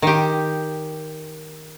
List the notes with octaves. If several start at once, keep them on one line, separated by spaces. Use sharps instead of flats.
D#3 G4